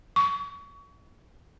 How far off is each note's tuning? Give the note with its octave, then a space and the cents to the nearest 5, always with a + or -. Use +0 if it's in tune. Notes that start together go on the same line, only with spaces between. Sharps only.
C#6 +30